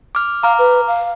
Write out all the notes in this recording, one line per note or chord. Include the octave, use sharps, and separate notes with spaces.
D6 F6
F5 A#5 D6 F6
B4
F5